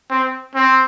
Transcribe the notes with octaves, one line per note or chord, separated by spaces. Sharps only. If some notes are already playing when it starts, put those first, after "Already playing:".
C4
C4